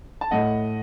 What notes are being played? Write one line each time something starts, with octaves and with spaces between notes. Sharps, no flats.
A5
A2 A3 D#5 F#5